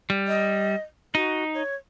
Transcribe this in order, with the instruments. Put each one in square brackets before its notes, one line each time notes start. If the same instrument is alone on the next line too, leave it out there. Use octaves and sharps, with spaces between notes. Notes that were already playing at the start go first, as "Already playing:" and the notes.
[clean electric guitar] G3
[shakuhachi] D#5
[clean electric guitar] D#4 [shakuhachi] F#4
[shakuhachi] C#5